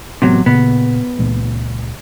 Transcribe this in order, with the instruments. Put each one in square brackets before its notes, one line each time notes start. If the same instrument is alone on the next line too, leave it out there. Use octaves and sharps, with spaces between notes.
[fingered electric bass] A1 B3 [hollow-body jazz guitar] C3 F#3
[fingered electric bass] A#2 C#3 [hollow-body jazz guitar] B3
[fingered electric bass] C#2 A#2